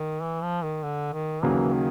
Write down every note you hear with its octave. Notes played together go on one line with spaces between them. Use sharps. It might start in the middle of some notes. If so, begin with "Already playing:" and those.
Already playing: D#3
E3
F3
D#3
D3
D#3
D#2 C#3 E3 F#3 A#3
D#3